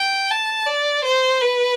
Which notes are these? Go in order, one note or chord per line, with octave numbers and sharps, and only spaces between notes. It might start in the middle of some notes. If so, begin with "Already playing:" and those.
Already playing: G5
A5
D5
C5
B4